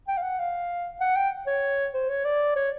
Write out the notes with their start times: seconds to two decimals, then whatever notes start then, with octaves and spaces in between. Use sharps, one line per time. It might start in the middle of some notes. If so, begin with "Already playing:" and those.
0.08 G5
0.17 F5
0.23 F#5
0.39 F5
1.00 F#5
1.16 G5
1.47 C#5
1.94 C5
2.09 C#5
2.25 D5
2.56 C#5